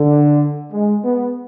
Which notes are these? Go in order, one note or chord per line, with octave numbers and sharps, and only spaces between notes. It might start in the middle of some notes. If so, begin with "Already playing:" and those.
Already playing: D3
G#3
B3